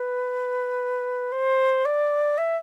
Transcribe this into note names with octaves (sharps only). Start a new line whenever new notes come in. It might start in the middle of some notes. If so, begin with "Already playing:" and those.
Already playing: B4
C5
D5
E5